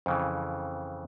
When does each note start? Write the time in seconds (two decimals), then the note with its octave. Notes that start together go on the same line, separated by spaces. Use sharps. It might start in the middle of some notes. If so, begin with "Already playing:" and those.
0.06 F2 C#3 E3